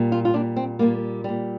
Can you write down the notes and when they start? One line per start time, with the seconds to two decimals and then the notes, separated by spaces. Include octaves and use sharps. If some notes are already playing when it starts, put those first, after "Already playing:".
Already playing: A#2 G3
0.12 F4
0.25 F4
0.34 A#2 G3 D4
0.56 C4
0.79 A#2 G3 A#3
1.24 A#2 G3